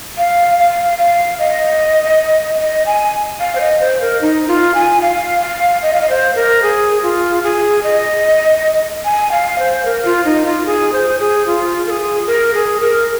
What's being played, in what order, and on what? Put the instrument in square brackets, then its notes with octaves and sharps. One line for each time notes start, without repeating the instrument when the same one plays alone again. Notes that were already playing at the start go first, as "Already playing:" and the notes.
[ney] F5
F5
F5
D#5
D#5
G#5
F5
C5
D#5
C5
A#4
D#4
F4
G#5
F5
F5
D#5
F5
D#5
C5
A#4
G#4
F4
G#4
D#5
G#5
F5
C5
A#4
F4
D#4
F4
G#4
C5
G#4
F4
A#4
G#4
A#4
G#4
A#4